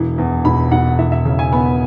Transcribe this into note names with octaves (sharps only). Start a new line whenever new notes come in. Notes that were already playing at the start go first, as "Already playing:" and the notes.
Already playing: E1 E3
E2
E1 B5
E1 F#5
E3 E5
E5
C#3
G#5
B3 B5